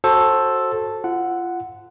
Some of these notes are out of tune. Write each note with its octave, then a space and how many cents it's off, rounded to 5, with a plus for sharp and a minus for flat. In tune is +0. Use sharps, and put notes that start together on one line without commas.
F#4 +0 A4 +0 C5 +20
F4 -25 F#5 +0